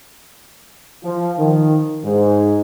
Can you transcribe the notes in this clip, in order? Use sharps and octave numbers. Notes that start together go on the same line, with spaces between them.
F3
D#3
G#2